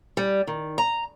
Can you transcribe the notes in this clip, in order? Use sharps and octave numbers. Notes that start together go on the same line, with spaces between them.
G3
D#3
A#5